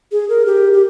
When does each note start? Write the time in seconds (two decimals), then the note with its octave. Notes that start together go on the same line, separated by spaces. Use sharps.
0.12 G#4
0.29 A#4
0.46 G4
0.73 G4